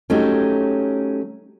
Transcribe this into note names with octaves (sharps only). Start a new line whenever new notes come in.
F#3 A3 C#4 D#4 G4